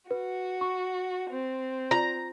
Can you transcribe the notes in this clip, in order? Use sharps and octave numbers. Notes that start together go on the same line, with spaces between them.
F#4 B4
C#6
C4
F4 A#5